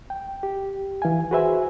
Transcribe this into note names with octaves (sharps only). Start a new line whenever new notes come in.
G5
G4
E3 F5 G#5
F#4 G#4 B4 C5 E5 G#5